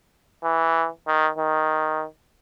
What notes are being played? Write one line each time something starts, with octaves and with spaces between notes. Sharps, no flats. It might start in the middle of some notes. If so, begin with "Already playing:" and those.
E3
D#3
D#3